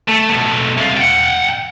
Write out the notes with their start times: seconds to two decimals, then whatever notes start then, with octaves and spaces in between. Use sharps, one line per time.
0.08 A3
0.30 B2 A3
0.78 C2 F4
0.97 F#5 G5